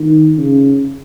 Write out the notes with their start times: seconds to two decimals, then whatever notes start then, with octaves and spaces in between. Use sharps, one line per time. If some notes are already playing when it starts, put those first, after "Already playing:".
Already playing: D#3
0.38 C#3